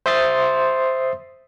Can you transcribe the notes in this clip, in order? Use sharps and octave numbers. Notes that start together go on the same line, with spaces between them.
C5 E5 C6 D#6 A6 C7